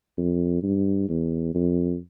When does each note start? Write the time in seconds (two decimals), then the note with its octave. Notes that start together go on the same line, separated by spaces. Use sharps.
0.18 F2
0.63 G2
1.09 E2
1.55 F2